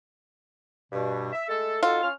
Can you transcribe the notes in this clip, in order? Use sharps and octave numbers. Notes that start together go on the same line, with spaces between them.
G2 B2
E5
G#3 A3 A4
D#4 F4 F#4 A4
C#4 C6 F6